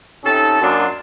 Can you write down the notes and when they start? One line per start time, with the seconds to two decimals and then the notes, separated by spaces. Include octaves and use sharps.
0.24 C3 C#4 D#4 A4
0.61 F#2 F#3 A#3 D4 F4 D#5